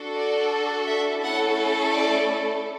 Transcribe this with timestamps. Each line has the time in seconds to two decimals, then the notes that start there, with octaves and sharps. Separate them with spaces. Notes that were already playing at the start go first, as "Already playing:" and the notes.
Already playing: D4 F#4 A4
0.17 D5
0.87 E5
1.24 A3 C#4 E4 A4 F#5
1.95 D5